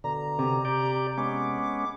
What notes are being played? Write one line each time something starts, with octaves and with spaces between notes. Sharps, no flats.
B2 D3 A#5
C3
G4 D5
G#3 B3 C#4 D6